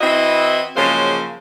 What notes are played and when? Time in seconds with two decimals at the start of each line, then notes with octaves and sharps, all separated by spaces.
0.01 E3 C4 E4 F#4 D#5
0.76 C#3 F3 F#3 G#3 A#3 C5